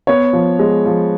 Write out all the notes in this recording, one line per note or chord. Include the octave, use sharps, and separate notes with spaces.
B3 C#5
F3
G#3
F3